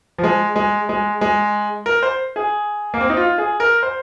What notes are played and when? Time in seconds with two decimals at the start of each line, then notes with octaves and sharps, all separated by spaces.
0.18 F3
0.24 G#3
0.56 G#3
0.89 G#3
1.21 G#3
1.86 A#4
2.03 C5
2.36 G#4
2.94 A#3
3.01 C4
3.10 D#4
3.17 F4
3.38 G#4
3.60 A#4
3.83 C5